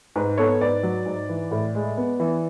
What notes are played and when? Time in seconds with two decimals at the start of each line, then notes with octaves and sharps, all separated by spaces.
0.16 G#2 B4
0.38 B3 A4 C#5
0.61 G#2 B4 D5
0.83 F#3
1.06 G#2
1.29 E3
1.51 A2
1.75 G#3
1.97 B3
2.20 E3